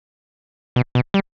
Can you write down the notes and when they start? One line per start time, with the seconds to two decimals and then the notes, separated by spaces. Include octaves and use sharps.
0.76 B2
0.95 B2
1.14 G3